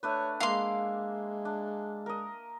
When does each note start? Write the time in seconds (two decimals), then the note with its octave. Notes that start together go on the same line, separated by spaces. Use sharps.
0.03 A3 D4 B4 C#5
0.40 G#3 A#3 E5 F5 C6 D6
1.45 D4
2.06 A#4 D#5